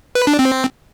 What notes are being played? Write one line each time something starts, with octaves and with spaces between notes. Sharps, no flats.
B4
D4
C4